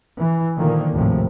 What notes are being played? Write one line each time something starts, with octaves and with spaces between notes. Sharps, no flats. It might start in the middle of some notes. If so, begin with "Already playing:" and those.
E3
A#2 D3 D#3 F3 A#3
G#1 D2 A2 C3 F3